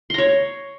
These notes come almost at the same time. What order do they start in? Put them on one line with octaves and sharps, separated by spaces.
C6 A#5 C#5